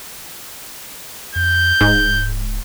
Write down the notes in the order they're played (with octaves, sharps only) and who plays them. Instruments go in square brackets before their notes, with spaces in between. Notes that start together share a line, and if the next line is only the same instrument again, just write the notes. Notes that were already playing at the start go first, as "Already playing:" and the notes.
[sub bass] F2 [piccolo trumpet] G6
[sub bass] D1 [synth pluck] G#2